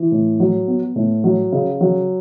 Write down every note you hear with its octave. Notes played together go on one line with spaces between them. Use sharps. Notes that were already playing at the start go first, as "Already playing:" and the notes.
Already playing: E3
A2
F#3
B3
A2
F#3
C#3
F#3